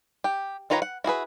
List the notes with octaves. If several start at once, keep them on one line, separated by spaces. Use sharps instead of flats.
G4
D#3 F4 B4 C#5 A#5
F#5
E4 F#4 G#4 B4